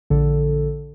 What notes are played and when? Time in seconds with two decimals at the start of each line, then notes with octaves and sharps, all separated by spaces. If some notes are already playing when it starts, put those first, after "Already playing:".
0.10 A#1 D3 A4